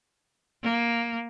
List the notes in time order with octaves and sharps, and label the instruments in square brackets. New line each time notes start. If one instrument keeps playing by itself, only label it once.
[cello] A#3